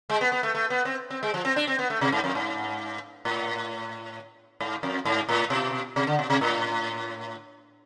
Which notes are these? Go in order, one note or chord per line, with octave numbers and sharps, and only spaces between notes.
G#3
B3
B3
A3
A3
B3
C4
C4
G#3
F3
C4
D4
C4
B3
A3
C3
G#2
F2
G#2
A2
G#2
F2
G#2
A2
B2
C3
D3
B2
C3
A2